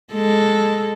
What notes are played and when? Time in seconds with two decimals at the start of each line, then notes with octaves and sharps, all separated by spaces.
0.13 G#3 A4